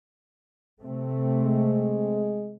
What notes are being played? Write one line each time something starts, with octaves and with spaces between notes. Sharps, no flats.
C3 A3 C4
G#3